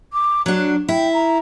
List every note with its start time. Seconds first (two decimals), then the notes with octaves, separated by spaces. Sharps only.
0.12 D6
0.46 F#3 D4 F#4
0.88 E4 G5
1.13 A#5